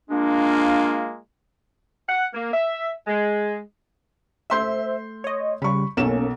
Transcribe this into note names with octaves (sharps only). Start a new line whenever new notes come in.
G#3 A#3 D4 F4
F#5
A#3
E5
G#3
A3 C5 E5 C6 G6
C#5 D#5
C#3 G3 B5 C#6
B1 A#3 C#4 A4 E7